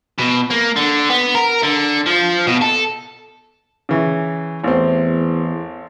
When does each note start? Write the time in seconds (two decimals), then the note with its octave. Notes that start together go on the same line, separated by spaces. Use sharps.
0.18 B2
0.50 A#3
0.76 D3
1.10 B3
1.35 A#4
1.63 D3
2.06 F3
2.47 B2
2.62 A4
3.89 C#3 E3
4.64 A1 E2 C4